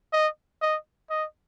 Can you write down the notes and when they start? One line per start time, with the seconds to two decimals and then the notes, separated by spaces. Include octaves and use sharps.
0.13 D#5
0.62 D#5
1.10 D#5